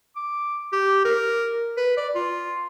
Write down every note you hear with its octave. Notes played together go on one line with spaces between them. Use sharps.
D6
G4
A#4
B4
D5
F4